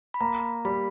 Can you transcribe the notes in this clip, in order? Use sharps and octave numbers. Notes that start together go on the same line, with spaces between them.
B5
A#3 A#5
G3 B5